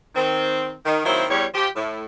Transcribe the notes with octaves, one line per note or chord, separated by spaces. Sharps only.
D#3 C4
D#3
D#3 F#3 A#3 C4 E4 C5
E2 G3 C#5
F3 G4
A2